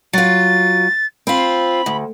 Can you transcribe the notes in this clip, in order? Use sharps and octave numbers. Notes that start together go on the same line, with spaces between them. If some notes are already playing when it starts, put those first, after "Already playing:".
F#3 F4 A6
C4 F4 B5
D2